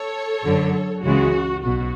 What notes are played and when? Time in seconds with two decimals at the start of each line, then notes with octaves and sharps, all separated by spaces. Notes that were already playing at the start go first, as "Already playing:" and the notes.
Already playing: A4 C#5
0.44 F#2 D3 F#3
1.03 C#2 C#3 E3 G#3 F#4
1.62 B1 B2 F#4